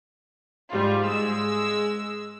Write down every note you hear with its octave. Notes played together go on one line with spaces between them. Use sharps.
G#2 G3 F4
G#3 E6